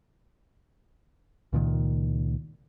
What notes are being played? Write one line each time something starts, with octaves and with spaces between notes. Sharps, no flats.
C#2 A#2 D#3